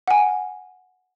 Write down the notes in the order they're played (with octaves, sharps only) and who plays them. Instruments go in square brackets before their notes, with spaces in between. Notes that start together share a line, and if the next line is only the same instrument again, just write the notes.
[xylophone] F#5 G#5